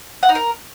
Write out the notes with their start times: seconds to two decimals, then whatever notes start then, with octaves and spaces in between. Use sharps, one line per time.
0.23 F#5
0.29 D#4
0.35 A#4